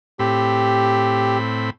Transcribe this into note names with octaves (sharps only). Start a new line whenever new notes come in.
A2 C4 G4 B5